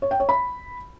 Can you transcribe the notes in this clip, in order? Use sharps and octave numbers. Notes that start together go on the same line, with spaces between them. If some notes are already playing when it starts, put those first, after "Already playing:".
C#5
G5
C#5
B5